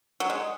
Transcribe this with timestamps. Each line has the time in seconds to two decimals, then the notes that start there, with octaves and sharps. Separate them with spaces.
0.20 F#3
0.30 G#3